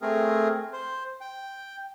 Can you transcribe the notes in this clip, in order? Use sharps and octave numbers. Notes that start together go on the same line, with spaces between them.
A3 C4 G#4 A#4
C5
G5